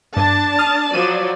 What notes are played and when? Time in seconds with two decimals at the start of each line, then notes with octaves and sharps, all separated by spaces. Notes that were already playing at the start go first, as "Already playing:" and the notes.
0.17 G2 D4 A5
0.59 D#6 F6
0.93 F3 F#3 D5 D#7 E7